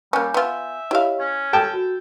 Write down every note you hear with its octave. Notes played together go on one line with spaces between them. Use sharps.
G3 A#3 C#4 G#5 G6
B3 F4 E5
E4 G4 C#5 D#5 F5
C#4 G#6
A4 G5 A5
F#4